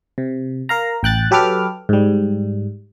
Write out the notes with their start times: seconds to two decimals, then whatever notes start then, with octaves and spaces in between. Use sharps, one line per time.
0.18 C3
0.69 A#4 F5 A#5
1.03 A1 G5 F#6 A6
1.31 F#3 G4 A4 B4 D6 F6
1.89 G#2 G3